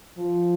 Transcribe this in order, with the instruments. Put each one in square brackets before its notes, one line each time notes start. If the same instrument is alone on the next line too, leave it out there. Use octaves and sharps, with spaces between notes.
[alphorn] F3